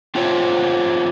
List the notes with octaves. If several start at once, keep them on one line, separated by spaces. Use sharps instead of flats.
C4 F4 G4 C5 C#5